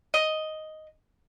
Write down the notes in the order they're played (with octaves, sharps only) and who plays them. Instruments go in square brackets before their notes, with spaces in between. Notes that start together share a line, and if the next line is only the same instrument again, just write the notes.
[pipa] D#5